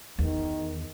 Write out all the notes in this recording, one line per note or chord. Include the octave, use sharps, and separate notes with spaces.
E2 D#3